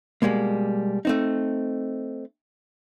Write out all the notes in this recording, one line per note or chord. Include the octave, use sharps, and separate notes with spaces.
B2 F3 G3 G#3 A#3
A3 C4 D#4